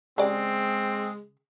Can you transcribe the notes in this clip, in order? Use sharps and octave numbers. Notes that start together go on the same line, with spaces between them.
C#3 G#3 C4 G4 D5